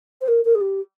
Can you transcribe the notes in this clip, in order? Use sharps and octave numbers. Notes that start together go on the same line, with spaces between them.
C5
A#4
A#4
G#4
G4